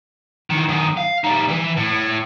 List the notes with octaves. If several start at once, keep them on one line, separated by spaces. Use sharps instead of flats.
D#3 E3
F#2 D#3
F5
G3 D#4
E3 B4
A2